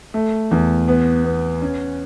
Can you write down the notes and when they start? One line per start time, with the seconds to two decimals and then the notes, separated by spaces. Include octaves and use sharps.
0.14 A3
0.51 E2
0.88 B3
1.24 B3
1.62 C#4